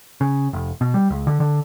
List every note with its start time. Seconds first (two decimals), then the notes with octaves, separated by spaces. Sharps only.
0.21 C#3
0.53 F1
0.81 B2
0.94 G3
1.10 C#2
1.27 D3
1.40 D3